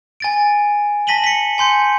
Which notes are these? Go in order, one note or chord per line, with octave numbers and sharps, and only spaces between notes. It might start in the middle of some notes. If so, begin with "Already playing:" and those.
G#5 A6 D7
A5 A#6 B6 D#7 F#7 G7
B6 C#7
G#5 C6 G6 C#7